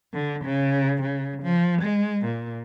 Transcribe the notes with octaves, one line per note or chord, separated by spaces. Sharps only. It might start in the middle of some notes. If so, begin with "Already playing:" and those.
D3
C#3
C#3
F3
G#3
A#2